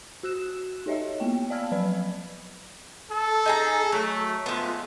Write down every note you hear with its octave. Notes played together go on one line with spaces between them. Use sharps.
F#4 E6 F#6 E7
D#4 G4 C#5 D#5 E5
A#3 B3 G5
D5 F5 A5 E6 F6 G#6
F3 F#3 B4 D5 B5
A4
D#4 G#4 A#5
F#3 A3
F3 G#3 A3 B3 F4